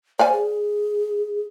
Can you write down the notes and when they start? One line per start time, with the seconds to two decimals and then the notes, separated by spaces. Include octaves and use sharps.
0.19 C5 D5 F5 G#5
0.32 G#4